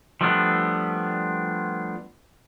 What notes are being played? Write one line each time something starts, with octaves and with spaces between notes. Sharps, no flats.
F3 G3 A3 B3 D4